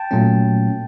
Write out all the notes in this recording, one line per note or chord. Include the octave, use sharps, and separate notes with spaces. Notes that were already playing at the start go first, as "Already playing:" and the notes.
Already playing: G5 A5
A#2 F#3 A3 C#4